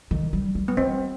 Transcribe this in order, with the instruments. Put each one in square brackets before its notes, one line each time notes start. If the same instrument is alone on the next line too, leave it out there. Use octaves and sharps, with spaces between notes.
[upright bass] D#3
G3
G3
[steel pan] B3
[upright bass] G3 [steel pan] C4